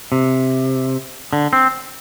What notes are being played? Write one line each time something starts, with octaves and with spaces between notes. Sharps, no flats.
C3
D3
C4